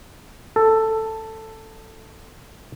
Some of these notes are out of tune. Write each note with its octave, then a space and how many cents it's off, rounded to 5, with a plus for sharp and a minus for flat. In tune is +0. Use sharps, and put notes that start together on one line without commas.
A4 +10